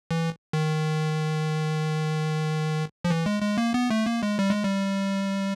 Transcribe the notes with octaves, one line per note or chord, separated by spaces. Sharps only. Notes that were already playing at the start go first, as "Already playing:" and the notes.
E3
D#3
F3
E3
G#3
G#3
A#3
B3
A3
A#3
G#3
G3
G#3
G3